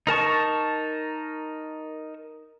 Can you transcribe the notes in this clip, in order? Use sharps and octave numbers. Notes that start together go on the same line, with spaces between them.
D#4 A#4 A5 C#6